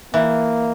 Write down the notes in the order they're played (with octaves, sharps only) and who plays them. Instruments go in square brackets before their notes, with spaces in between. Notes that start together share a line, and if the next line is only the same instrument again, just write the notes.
[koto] E3 [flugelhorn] A#3